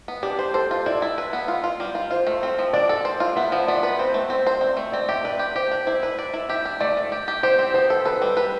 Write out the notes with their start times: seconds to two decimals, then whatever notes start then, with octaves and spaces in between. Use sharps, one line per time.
0.08 B3
0.23 D4 G4
0.39 C5
0.54 A4 C5
0.71 F4
0.86 E4 D5
1.02 E4
1.18 B4
1.33 B3
1.48 F4
1.64 F4
1.80 G3
1.95 F4
2.11 F4 C5
2.27 A3
2.43 C4
2.59 F3
2.73 D4 D5
2.89 A4
3.05 C5
3.20 F4
3.36 B3 E5
3.52 F3
3.67 B3 D5
3.83 B4
3.99 C4 C5
4.14 A3
4.30 C4 C5
4.47 C5
4.61 C4 D5
4.77 A3
4.92 C4 D5
5.09 G4 E5
5.24 B4 D5
5.39 G4
5.55 G4 C5
5.71 D4
5.86 E4 C5
6.03 B4
6.19 D5
6.33 E4
6.49 G4 E5
6.65 D4
6.80 A3 D5
6.97 A3
7.12 G4
7.28 G4
7.43 G4 C5
7.59 C4
7.74 B3 C5
7.90 A4
8.05 A4 B4
8.22 G3
8.37 B4